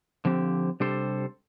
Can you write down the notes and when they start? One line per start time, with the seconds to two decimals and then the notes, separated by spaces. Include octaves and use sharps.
0.25 D3 F3 C4 G4
0.80 C3 G3 D4 A4 C5